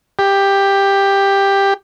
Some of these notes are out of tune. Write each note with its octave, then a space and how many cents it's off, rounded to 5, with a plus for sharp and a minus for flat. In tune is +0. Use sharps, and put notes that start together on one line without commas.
G4 +10